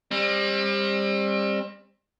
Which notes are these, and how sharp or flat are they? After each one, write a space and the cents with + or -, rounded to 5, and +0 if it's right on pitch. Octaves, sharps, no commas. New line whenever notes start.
G3 +30 C4 +35